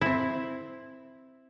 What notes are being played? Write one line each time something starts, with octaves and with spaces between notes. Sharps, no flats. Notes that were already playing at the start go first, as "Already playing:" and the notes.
C4 E4